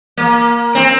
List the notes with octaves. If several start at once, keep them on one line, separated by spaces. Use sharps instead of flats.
A#3
C4